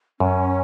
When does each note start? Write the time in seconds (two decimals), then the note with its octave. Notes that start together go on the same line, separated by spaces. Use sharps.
0.20 F#2 C#4